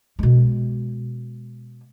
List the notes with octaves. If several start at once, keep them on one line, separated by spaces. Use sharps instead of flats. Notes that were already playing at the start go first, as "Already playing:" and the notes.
B2 G#3